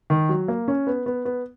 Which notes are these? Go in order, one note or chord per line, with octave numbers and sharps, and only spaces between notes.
D#3
F#3
A#3
C#4
B3
B3
B3